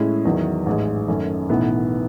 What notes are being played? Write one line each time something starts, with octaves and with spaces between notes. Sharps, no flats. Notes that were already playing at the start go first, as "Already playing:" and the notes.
Already playing: A2 G#3 C#4 E4
E2 D#3 F#3
A1 G#2 E3 G#3
F#2 D#3 A3 C#4
B1 A2 E3 B3